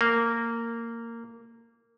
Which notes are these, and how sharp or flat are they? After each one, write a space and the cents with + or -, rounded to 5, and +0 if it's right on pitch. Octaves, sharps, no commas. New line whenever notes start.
A#3 -15